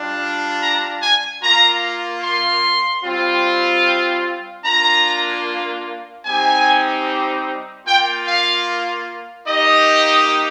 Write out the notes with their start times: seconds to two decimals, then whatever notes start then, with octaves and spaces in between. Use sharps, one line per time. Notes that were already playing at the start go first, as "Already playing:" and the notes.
Already playing: G3 D4 F4
0.62 A#5
1.02 G#5
1.43 A#3 F4 A#5
2.23 C6
3.04 G3 C4 F4
4.65 A#3 D4 F4 A#5
6.25 G3 C4 D#4 G4 G#5
7.87 A#3 F4 G5
8.27 F5
9.47 A#3 D#4 G4 D#5